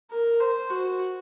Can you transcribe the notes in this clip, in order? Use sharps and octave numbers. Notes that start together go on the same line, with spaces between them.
A#4
C5
F#4